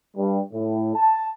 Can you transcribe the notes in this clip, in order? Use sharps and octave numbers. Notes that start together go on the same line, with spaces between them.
G2
A2
A5